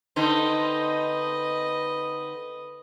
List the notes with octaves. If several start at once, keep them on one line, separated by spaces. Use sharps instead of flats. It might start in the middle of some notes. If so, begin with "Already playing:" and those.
D3 C4 D#4 B4 D#5